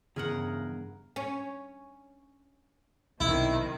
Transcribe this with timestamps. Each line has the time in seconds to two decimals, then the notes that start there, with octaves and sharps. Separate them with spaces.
0.16 E2 G2 C#3 G#4 A#4 F#5
1.16 C#4
3.20 B1 C3 D#3 E4